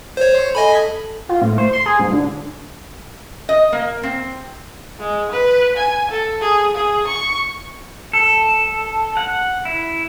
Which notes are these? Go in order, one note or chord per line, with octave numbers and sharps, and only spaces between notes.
C5 C#5
A4 D#5 G#5 B5
F4
A2
C5
C6
G#4
G#2
D3
D#5
A#3
C4
G#3
B4
G#5
A4
G#4
G#4
C#6
A4
F#5
E4